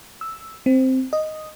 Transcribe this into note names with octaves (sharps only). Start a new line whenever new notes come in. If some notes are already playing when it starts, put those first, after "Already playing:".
E6
C4
D#5